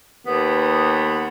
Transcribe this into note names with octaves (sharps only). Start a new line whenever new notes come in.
D#2 B3